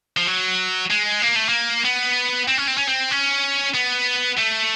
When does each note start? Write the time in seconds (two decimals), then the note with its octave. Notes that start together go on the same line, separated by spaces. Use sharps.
0.17 F3
0.27 F#3
0.90 G#3
1.22 A#3
1.36 A3
1.49 A#3
1.85 B3
2.48 C4
2.58 C#4
2.68 C4
2.78 C#4
2.88 C4
3.11 C#4
3.74 B3
4.37 A3